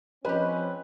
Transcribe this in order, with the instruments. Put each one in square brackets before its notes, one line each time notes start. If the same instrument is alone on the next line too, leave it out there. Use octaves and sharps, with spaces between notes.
[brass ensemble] F3 C4 C#4 [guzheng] G#3 G4 [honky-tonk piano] B4